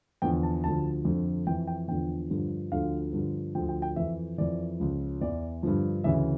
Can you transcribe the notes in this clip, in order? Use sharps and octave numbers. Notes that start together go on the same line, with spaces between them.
E2 D3 F3 G5
A5
D2 D3 F3 A5
F2 D3 F3
F2 E3 G5
G5
E2 D3 F3 G5
G2 D3 F3
D2 D3 F3 F5
G2 D3 F3
D2 D3 F3 G5
G5
G5
F2 E3 E5
F2 E3 D5
C#2 C#3 F3
E2 E3 D5
G2 D3 F3
D2 C#3 E3 E5